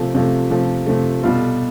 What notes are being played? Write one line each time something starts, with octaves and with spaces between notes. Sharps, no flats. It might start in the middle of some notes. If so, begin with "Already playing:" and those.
Already playing: C3 F3 A3
C3 F3 A3
C3 F3 A3
C3 F3 A3
B2 G3 B3 F4 A4